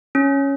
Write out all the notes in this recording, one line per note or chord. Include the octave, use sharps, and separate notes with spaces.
C#4